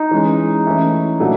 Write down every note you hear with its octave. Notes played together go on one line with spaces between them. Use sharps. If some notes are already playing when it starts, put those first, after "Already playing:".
Already playing: D#4
E3 G#3 C#4
E3 A3 C#4 E4
A#2 F#3 A3 D4 F#4